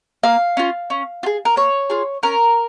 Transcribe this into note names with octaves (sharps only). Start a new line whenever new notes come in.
A#3 F5
C#4 F4
C#4
F4
G#4
A#4
A#3 C#5
F4 G#4
C#4 A#4